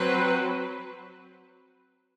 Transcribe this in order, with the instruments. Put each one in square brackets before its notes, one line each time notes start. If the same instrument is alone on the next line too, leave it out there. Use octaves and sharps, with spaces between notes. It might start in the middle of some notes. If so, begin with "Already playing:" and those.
Already playing: [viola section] F#3 C4 B4